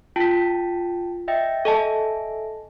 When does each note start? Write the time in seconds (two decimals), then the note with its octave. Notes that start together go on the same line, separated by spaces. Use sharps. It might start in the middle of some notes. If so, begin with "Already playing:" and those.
0.16 F4 G5 A5 A#6 B6
1.28 D#5 E5 G5
1.65 A4 D#5 E5 G#5 A5